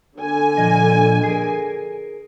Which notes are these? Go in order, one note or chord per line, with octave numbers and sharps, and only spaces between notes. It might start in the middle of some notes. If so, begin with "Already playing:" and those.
D3 G#5
A#2 F3 D#5
G#4 A#4